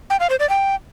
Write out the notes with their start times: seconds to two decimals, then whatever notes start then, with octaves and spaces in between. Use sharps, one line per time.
0.10 G5
0.20 F5
0.30 C5
0.40 D5
0.49 G5